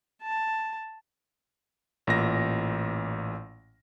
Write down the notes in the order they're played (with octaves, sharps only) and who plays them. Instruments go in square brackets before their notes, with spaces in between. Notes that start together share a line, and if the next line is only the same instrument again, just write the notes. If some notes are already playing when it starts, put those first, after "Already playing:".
[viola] A5
[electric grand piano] A1 A#2 A#6